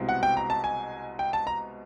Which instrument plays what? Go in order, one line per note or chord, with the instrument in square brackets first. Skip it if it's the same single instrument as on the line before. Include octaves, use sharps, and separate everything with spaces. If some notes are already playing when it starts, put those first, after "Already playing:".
Already playing: [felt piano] C2 B2 G#3 C4 E4
[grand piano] F#5
G5
A#5
A5
G#5
G5
A5
A#5